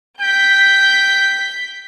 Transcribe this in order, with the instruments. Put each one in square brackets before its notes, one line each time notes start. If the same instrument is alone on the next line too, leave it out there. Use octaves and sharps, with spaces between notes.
[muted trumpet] G5 [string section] G6 B6